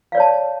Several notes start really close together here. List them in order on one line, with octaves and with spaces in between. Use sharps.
F5 D5 C#5 A5